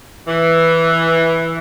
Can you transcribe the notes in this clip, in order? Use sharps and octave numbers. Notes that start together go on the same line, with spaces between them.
E3